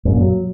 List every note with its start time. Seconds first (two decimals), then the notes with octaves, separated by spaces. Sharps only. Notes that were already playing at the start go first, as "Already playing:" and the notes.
0.05 F#2
0.13 A#2
0.20 F#3